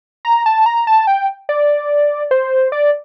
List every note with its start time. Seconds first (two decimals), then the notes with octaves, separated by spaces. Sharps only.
0.25 A#5
0.46 A5
0.66 A#5
0.87 A5
1.07 G5
1.49 D5
2.31 C5
2.72 D5